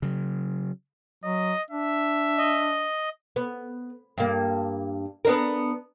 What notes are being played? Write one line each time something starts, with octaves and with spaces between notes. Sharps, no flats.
C#3 F#3
F#3 D#5
D4 E5
D#5
B3
G2 A#3
B3 D4 A#4